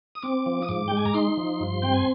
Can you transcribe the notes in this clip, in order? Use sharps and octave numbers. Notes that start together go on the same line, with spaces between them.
D#6
C4 D6
F3
D#6
G#2 D6
G#3 G5
G#5
A#5
D#4 C6
F3
G2
C4 G5
G#5